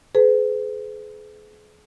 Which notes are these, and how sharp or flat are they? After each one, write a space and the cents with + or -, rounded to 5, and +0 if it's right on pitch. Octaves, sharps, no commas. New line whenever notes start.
G#4 +35 B4 +40